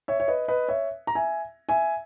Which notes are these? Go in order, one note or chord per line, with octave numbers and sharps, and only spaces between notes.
C#5 E5
C#5
B4 D#5
B4 D#5
C#5 E5
A#5
E5 G#5
E5 G#5